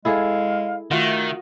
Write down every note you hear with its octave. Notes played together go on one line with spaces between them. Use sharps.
G#3 E4 G#4 A4 F5
D#3 A3 F4 F#4 E5